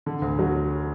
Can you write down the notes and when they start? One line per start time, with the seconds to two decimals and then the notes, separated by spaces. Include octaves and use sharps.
0.06 D3
0.22 D2
0.39 F#3